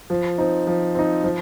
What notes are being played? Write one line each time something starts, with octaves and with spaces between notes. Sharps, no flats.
F3
C4 D#4
F3
C4 D#4
F3